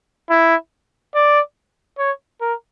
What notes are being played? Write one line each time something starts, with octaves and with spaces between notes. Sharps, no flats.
E4
D5
C#5
A#4